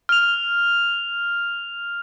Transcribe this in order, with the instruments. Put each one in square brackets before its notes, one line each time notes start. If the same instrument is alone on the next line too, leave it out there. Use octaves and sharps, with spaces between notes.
[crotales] F6 F7